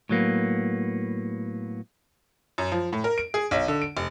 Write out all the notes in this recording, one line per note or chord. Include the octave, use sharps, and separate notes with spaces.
A2 F#3 A#3 B3
F#2
F3
A2
A#4
D7
G#4
B1
D3
D7
F1